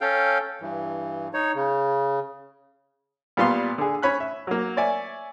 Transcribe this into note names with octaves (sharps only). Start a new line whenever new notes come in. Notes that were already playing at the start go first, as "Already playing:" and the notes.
C#4 A4 F5 G5
G2 E3
D#4 C#5
C#3
A#2 G3 B3 F5 C6
D3 G#4
C#4 C#5 B5 F#6
E5
F#3 A#3
C#5 D5 E5 G#5